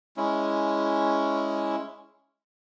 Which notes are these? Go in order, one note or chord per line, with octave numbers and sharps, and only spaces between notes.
G#3 C#4 E4